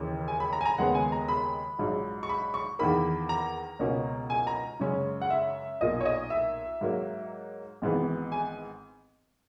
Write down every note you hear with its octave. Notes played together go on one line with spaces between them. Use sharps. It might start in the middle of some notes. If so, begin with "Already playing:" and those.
Already playing: D#2 C#3 E3
G#5
B5
A#5
G#5
A#5
D#2 C#3 G#3 B3 F#5
G#5
A#5
B5
A#1 G#2 F#3
C#6
B5
C#6
E2 D#3 A#3 B5
A#5
C#2 B2 A#3 C#4
G#5
A#5
F#2 C#3 G#3 C#4
F#5
E5
B1 A#2 A#3 D#5
C#5
D#5
E5
G#2 F#3 A#3
G#1 G#2 E3 B3
G#5